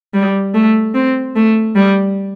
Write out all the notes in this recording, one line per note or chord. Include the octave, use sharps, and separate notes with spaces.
G3
A3
C4
A3
G3